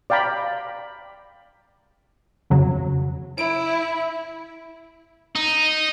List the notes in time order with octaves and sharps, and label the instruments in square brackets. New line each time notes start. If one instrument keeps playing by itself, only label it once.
[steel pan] D5 F5 G5 A#5 B5
[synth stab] F2 C#3 F#3
[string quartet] E4 [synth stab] D7
[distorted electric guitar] D#4